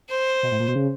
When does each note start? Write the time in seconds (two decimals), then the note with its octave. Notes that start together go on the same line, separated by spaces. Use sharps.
0.10 C5
0.43 B2
0.52 A2
0.60 A#2
0.68 B2
0.75 C#3